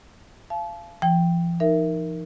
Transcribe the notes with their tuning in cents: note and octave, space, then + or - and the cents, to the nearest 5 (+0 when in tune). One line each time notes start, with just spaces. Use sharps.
F5 -30 A5 -35
F3 -45 G5 +0
D#4 +0 A#4 +0 E5 +0